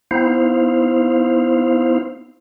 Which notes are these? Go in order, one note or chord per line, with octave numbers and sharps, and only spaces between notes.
B3 C4 D#4 E4 C5 F5